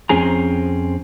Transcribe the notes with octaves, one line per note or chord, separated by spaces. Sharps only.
F2 C4 C#4 G#4 A#5